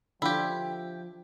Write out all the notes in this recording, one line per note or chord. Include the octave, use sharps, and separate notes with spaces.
D3 F3 D4 E4 F4 G4 G5